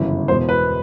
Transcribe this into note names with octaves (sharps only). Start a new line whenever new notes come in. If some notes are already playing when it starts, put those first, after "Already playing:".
Already playing: G1 F#2 C#3 E3
E1 E2 B2 C5
B4